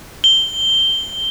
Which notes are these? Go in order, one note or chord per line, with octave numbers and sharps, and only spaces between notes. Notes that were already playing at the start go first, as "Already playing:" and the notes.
G7